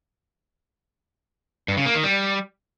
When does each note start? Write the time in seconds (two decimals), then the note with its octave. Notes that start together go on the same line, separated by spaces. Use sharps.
1.68 G2
1.77 C#3
1.86 A#3
1.95 D#3
2.03 G3